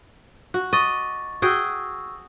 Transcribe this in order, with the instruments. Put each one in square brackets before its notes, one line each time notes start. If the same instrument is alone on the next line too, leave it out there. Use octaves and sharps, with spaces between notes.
[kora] F#4
[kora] D#5 [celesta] C#6 D6 A6
[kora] F#4 G#4 G5 [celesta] C#6 E6